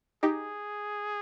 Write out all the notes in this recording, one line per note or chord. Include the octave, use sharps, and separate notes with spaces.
D#4 G4 G#4